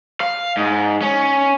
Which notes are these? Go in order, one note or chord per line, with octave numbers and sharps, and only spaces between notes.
F5
G#2
C#4